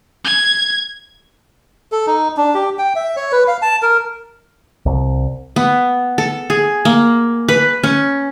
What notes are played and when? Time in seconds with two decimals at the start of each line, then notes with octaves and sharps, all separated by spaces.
0.25 G#6
1.92 A4
2.07 D#4
2.37 D4
2.54 G4
2.79 G5
2.96 E5
3.16 C#5
3.32 B4
3.48 F5
3.62 A5
3.82 A#4
4.86 C2
5.56 B3
6.18 A4
6.50 G#4
6.85 A#3
7.48 B4
7.84 C#4